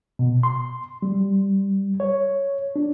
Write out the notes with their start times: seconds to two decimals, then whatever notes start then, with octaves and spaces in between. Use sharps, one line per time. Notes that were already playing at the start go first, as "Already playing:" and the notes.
0.19 B2
0.43 C6
1.02 G3
2.00 C#5
2.76 D4